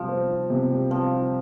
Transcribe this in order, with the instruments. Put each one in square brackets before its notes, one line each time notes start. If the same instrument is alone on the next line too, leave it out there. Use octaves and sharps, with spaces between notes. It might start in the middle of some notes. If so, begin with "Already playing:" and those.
Already playing: [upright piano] C3 G3 [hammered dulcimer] F3
[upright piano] C4
F4
C3
G3
[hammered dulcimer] F3 [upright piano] C4
[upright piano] F4